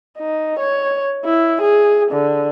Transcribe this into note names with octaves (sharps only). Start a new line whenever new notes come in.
D#4
C#5
E4
G#4
D3